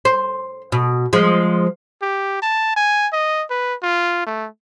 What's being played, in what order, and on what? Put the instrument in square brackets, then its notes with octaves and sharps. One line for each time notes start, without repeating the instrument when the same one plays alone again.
[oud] C5
B2
F3 G#3
[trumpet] G4
A5
G#5
D#5
B4
F4
A3